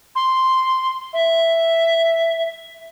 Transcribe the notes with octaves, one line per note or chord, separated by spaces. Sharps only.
C6
E5